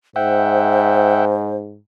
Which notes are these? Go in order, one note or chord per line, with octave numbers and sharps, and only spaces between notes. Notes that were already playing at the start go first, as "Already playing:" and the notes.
G#2 C5 E5 F#5 G5